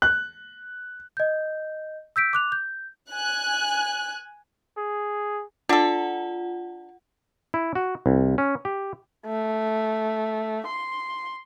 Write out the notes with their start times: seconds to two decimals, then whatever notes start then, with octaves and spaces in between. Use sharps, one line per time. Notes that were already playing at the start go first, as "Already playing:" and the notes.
0.02 F#6
1.17 D#5 G6
2.16 E6 G6 B6 D7
2.33 D6 F#6 F7
2.52 G6
3.11 G#5 F#6
4.77 G#4
5.69 D4 F4 A4 F#5
7.54 E4
7.75 F#4
8.06 C2
8.38 C#4
8.65 G4
9.26 A3
10.66 C6